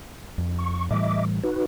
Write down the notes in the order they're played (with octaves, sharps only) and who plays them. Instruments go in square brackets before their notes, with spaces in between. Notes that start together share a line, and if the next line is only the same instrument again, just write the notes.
[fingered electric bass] F2
[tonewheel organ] C#6
[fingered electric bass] A2 E3 G3 [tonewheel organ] D#5 E5 D6
[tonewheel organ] D#4 F#4 B4